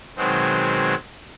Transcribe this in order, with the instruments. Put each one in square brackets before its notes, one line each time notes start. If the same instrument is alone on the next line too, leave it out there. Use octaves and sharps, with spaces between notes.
[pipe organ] B2 D#3 F#3 G#3 C4